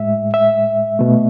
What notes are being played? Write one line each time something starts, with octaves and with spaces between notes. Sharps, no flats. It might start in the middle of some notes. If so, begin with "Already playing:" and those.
Already playing: A2 G#3 E5
E5
B2 A3